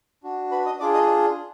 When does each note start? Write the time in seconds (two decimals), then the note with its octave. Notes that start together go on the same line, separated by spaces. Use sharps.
0.24 D4 F#4
0.51 B4 B5
0.66 D#5 D#6
0.80 D4 F4 G#4 D5 D6
0.94 D#5 D#6